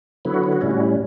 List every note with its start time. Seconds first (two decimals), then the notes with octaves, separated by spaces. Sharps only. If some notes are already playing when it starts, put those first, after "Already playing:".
0.25 D3 F#3 B3 E4
0.34 F#4
0.44 E4
0.53 F#4
0.61 A2 G3 C#4 E4
0.71 F#4
0.80 E4